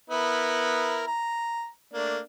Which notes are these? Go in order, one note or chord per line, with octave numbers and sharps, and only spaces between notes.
B3 E4 A#4
A#5
A3 A#3 D4